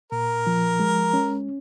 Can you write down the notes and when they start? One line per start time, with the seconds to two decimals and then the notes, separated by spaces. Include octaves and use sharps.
0.12 A#2 A#4
0.47 F3
0.80 G#3
1.13 C#4